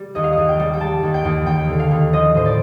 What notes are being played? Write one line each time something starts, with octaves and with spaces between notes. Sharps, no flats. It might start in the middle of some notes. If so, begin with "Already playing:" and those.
Already playing: G3
D#2 D#5
F5
D#2 D#5
G5
G3
G5
G3 A5
D#2
G5
D#2
D#2 G5
D3
F5
D#2
F3 D#5
A2 C5
D5